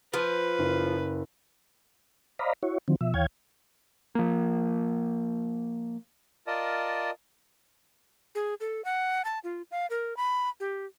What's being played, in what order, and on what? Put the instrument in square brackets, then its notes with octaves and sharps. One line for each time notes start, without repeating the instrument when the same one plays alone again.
[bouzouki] F3 [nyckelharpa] B4
[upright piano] F#1
[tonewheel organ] C5 D5 D#5 F5 A#5 B5
E4 F#4 C#5
D3 D#3 F3 F#3 C4
B2 F3 E5
D#2 E3 C#5 F5 G5 G#6
[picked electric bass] F3 A#3
[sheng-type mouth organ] F4 A#4 D5 D#5 A5 D#6
[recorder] G#4
A4
F#5
A5
F4
F5
A#4
B5
G4